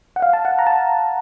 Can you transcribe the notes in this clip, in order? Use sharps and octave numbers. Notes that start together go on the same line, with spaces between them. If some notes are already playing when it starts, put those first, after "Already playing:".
F#5
F5
A5
F#5
A#5
A5